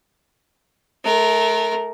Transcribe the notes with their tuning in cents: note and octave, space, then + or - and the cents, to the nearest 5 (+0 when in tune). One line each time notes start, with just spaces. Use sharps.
A3 -30 A#4 +0